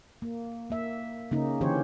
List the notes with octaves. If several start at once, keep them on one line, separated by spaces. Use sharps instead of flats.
A#3
A#3 E5
C#3 A#3 C#4 D#4
D3 E3 C#4 G4 C5 C#5